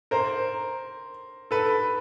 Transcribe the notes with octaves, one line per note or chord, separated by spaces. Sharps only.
A#4 C5
A4 B4